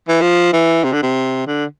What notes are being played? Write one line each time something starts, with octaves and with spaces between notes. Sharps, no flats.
E3
F3
E3
C3
D3
C3
D3